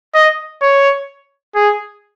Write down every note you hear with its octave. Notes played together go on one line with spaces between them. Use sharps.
D#5
C#5
G#4